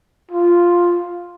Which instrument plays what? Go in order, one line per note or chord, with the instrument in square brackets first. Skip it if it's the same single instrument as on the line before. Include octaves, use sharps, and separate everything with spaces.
[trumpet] F4